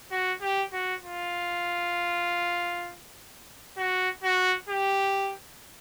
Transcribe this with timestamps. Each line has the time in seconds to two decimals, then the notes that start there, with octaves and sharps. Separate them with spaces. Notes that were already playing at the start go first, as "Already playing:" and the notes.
0.11 F#4
0.42 G4
0.73 F#4
1.03 F4
3.77 F#4
4.24 F#4
4.69 G4